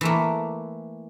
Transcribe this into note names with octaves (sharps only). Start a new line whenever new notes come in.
E3 A3 A#3